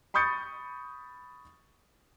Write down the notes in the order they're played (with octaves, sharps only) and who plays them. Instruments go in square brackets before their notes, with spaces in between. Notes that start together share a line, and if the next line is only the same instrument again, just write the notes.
[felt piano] B5 C#6 D#6 G6 A6 C#7